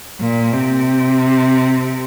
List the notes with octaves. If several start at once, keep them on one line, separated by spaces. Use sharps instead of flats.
A#2
C3